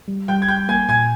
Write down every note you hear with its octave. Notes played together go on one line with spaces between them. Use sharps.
G3
G3 G5 G6
G#6
G3 G5 G6
A#3 G#5 G#6
A#2 G#5 G#6